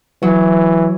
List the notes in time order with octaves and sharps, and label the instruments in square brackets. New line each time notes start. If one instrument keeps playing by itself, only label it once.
[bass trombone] E3 [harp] F#3